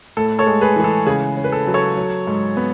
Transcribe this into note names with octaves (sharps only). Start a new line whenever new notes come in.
A2 A4
A4 C#5
G#3
G#4 B4
E3 G#4
A4
C#3 G#4
C#4
B4
A4
F#3
A4 C#5
F#3
G#2
B3